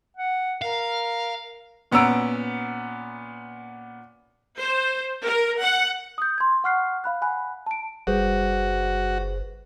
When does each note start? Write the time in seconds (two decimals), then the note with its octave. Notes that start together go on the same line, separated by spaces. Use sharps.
0.17 F#5
0.62 A#4 F5
1.92 A#2 B3 C#4 A#5 E6 D7
4.58 C5
5.22 A#4
5.60 F#5
6.18 D#6 G6
6.38 C6 G#6
6.64 F#5 C#6 F6 F#6 C7
7.04 F5 B5 F#6
7.21 F#5 G#5 B5 F#6
7.66 A5 D7
8.07 F#1 G3 F#4 G#4 B4 C5